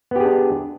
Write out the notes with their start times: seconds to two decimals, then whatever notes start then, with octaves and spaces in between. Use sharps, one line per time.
0.11 B3
0.16 G4
0.20 G#4
0.25 D4